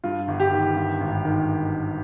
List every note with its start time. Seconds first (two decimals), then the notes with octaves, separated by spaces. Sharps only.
0.04 G2 F4
0.28 G1
0.40 G4
0.52 D#3
0.76 G2
1.01 G#1
1.25 D#3